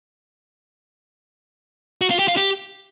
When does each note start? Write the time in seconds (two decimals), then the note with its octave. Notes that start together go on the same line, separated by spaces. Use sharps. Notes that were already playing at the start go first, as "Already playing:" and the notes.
2.01 F#4
2.10 F4
2.19 G4
2.28 F4
2.37 G4